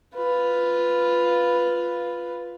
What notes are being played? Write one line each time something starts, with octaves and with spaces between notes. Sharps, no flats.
F4 B4